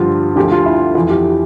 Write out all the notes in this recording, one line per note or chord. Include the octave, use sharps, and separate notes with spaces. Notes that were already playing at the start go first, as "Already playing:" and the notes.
Already playing: G2 D3 F3 F4 G4
D2 D3 F3 G4
F4
E4
F2 E3 F4
G4